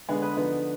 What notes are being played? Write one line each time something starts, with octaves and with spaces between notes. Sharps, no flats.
D3 G#3 B3 G#4
B4
D3 F3 B3 D#4